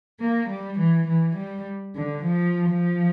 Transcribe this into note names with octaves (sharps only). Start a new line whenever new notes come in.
A#3
G3
E3
E3
G3
D3
F3
F3